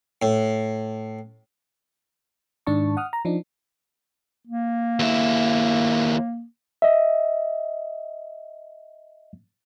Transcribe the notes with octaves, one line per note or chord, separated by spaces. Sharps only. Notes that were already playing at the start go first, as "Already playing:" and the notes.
A2
G#2 D#3 D4 A5 C#6
F#5 D#6 F6
A#5
F3 D4 D#4
A#3
D#2 E4
D#5 E5